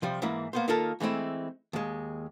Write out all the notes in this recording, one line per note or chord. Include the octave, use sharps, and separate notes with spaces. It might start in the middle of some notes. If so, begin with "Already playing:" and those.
C3 F3 G3
G#2 E3 A#3 E4
A#3 B3 C5
D#3 A#3 F4 A4 A#4
E3 G#3 A3 C4 E4
D#2 G#3